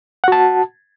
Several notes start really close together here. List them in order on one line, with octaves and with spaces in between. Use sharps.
F#5 F#4 A5